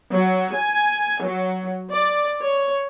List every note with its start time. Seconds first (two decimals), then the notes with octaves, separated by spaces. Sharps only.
0.11 F#3
0.54 G#5
1.21 F#3
1.91 D5
2.41 C#5